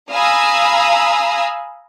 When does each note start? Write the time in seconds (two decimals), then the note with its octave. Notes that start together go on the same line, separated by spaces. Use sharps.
0.10 F5 G#5 A#5 B5 D#6 E6